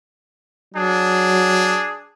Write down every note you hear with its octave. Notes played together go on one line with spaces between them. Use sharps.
F#3 D4 G#4